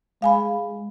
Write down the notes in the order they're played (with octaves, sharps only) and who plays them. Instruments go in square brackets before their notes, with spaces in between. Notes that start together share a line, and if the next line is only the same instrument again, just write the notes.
[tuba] G#3 [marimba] F5 G#5 B5